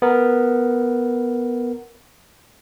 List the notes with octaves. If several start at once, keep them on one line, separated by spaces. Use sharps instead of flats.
B3 A#4